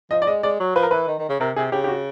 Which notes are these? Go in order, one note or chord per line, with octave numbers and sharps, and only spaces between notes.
F3 D#5
D5
G#3 D#5
G#3 D5
F#3
F3 B4
A#4
E3 B4
D#3
D#3
C#3
C3 A#4
C3 G#4
C#3 G4
G4
F#4